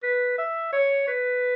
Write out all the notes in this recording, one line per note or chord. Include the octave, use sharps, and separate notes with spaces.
B4
E5
C#5
B4